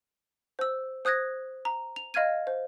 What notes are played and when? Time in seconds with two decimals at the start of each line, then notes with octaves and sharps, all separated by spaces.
0.59 C5 E6
1.05 C5 D#6 F#6 G#6 A#6
1.65 A#5
1.96 F7
2.14 D#5 F5 F6 G#6 D#7
2.47 C5